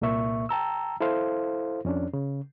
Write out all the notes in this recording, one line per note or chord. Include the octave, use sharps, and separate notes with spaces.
C2 A#2 A#3 E5 C#6
G5 A5 A#5 E6
E4 A4 C5 F5
F2 C#4 D4
C#3